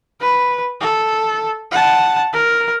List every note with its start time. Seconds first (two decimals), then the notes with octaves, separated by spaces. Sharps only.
0.20 B4
0.81 A4
1.71 F#5 A5
2.33 A#4